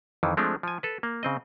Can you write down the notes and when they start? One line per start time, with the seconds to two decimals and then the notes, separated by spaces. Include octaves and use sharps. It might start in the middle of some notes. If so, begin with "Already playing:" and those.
0.23 F2 D#3 E3
0.37 F3 G#3 A3 C4 D4
0.63 F3 G#5
0.83 A4 B4
1.03 A#3
1.23 C#3 C4 D#5